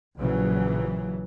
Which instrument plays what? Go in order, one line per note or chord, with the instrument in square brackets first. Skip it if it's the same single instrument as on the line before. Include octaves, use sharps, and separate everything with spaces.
[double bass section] A#1 C#3 E3 F#3